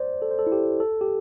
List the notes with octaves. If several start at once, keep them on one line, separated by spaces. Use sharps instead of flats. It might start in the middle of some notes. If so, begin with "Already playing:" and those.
Already playing: C5 D5
A4
C5
A4
E4
G4
A4
G4